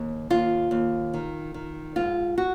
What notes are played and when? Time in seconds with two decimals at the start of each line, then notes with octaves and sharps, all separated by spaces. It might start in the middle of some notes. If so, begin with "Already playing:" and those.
Already playing: D#2
0.30 D#2 F4
0.71 D#2
1.14 D#3
1.54 D#3
1.96 G#2 F4
2.38 F#4